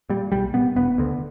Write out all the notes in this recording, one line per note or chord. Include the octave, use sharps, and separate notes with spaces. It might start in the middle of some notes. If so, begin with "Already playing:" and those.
A#2 G3
B1 G3
A#2 B3
E1 B3
D2 D3